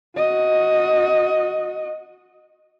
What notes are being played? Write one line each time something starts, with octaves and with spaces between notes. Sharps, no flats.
F#4 D#5